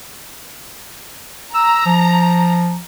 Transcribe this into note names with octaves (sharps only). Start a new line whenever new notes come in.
A#5 E6
F3